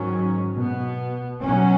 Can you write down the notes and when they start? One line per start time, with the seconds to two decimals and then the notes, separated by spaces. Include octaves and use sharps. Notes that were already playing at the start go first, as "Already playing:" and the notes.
Already playing: G#2 D#3 F#3 C#4
0.56 B2 B3
1.44 B2 F#3 C#4